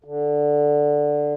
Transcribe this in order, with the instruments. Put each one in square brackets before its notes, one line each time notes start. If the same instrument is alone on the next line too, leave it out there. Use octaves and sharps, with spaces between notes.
[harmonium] D3